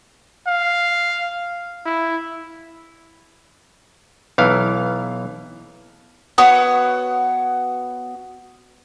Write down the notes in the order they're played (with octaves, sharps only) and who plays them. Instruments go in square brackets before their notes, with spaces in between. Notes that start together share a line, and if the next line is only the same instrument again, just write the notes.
[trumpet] F5
E4
[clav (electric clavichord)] B1 E3 F5
[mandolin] B3 F#4 C#5 D#6